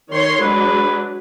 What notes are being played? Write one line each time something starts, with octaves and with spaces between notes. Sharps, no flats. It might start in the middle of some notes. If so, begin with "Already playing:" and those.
D#3 C#5 C6
F#3 G#3 D4 B4